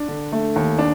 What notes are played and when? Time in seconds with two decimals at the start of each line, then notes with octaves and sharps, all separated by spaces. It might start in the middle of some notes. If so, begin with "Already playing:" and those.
Already playing: D4
0.08 D3
0.32 A3
0.56 D#2
0.79 D4